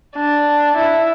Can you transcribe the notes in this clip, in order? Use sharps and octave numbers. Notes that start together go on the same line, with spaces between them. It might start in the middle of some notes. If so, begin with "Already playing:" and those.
D4
E4